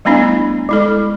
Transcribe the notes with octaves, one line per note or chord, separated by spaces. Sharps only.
G3 A3 B3 D4 E4
G#3 E4 A4